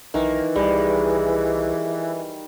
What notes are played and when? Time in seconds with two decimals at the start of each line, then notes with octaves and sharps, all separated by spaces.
0.14 B1 D#3 E3 A#3
0.55 C2 G3 G#3